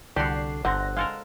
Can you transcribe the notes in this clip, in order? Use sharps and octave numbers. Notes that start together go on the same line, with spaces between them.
C2 D3 D4 F#4 G4 C7
G1 D3 C4 F#5 A#6
G#3 A4 A#4 F5